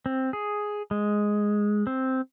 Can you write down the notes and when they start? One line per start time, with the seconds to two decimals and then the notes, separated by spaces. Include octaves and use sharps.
0.06 C4
0.33 G#4
0.91 G#3
1.87 C4